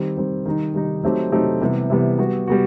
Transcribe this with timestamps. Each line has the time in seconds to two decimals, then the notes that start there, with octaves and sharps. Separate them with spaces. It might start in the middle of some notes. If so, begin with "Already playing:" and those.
Already playing: D#3 G3 C4
0.17 D#3 G3 C4
0.46 D#3 G3 D#4
0.74 D#3 G3 D#4
1.04 F#3 A3 C4 D#4 G4
1.32 F#3 A3 C4 D#4 G4
1.61 C3 E3 G3 B3
1.90 C3 E3 G3 B3
2.19 G3 B3 F#4
2.48 G3 B3 F#4